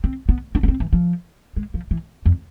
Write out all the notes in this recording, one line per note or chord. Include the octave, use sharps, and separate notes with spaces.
C4
B3
D4
B3
C4
E3
F3
G#3
F3
E3
F2